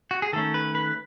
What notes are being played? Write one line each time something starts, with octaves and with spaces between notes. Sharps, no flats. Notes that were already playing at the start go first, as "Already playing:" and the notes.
F#4
G#4
D#3 A3 C#4 A4
B4
B4